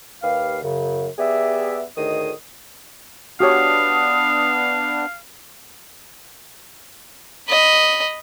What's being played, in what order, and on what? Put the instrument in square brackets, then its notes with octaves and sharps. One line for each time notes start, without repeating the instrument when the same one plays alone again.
[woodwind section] D#2 G4 B4 F5
F#2 C#3
B3 G4 G#4 D5 E5
D2 A2 D#3 G#4 D#5 D#6
[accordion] B3 D4 [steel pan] F#4 G4 C#5 [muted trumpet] F5 [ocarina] D#6
[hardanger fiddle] D#5 B5